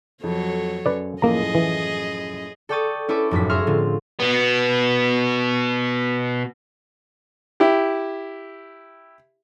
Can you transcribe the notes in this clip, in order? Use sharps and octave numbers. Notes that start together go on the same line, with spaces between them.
F2 F#3 A4 C#5
F#2 B4 D5
F#2 A2 F3 A#3 G#4 D#5 A#5
E3
A4 D5 G5 C#6 D#6 A6
C#4 E4 A4 B4 D6
F1 F#2 A2 B6
G#4 C#5 E5 A#5 C6 F6
A2 D3 C4 F4
B2 B3
E4 G4